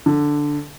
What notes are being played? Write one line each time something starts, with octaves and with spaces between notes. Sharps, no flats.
D3